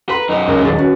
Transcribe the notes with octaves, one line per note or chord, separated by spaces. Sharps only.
A4 B4 A#5 C6
F#2 D#4
C#2 A#4
D#1 G#4 A6
C#4 F#4 B4